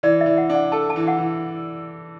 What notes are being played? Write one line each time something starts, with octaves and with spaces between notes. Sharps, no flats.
E3 D5
E5
E3
F#5
D4
F#5
A4 A5
A5
E3
F#5
E3